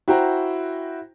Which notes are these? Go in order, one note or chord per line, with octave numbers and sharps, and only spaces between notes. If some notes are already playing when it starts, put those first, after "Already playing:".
E4 F#4 C5 G5 A#5